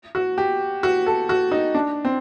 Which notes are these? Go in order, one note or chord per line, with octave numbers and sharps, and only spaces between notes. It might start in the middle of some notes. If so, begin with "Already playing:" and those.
F#4
G4
F#4
A4
F#4
D#4
D4
C4